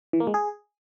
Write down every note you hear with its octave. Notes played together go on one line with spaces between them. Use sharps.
E3
A#3
G#3
G#4